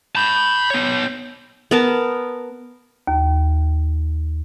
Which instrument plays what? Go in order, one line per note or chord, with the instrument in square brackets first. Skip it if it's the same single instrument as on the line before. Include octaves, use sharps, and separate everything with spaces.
[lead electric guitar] A5 B5 [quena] G6
[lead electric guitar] B3 C#5
[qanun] B3 A#4 A5
[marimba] D#2